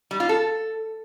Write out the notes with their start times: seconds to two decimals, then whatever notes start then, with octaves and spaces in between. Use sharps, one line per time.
0.11 G3
0.20 F4
0.29 A4